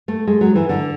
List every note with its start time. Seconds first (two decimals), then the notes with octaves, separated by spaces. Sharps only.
0.08 A3
0.27 G#3
0.41 F#3
0.55 E3
0.69 D3